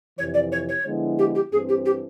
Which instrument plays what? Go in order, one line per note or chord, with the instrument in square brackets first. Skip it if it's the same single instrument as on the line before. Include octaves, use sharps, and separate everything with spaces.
[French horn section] F2 C3 E3 [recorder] C#5
[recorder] D5
C#5
C#5
[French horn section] D3 F3 G#3 B3 E4
[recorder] G4
G4
[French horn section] G2 E3 A3 C4 [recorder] G#4
[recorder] G4
G4